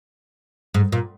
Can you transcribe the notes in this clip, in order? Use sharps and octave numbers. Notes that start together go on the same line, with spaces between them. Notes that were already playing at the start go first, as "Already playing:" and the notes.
G#2
A#2